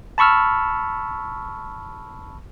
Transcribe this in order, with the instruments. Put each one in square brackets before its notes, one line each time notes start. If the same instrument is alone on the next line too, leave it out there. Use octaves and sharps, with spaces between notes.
[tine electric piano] A5 B5 C#6 E6 F6